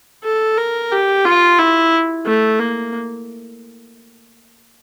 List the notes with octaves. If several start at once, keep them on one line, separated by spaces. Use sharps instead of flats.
A4
A#4
G4
F4
E4
A3
A#3